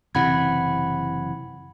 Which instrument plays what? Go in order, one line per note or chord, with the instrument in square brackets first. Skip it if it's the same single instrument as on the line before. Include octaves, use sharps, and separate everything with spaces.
[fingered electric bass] F#1 C3 E3 [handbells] F#5 B5 G#6